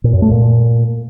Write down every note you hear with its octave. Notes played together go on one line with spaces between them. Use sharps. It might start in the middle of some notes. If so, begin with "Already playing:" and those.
A#2
F#2
A3
A#2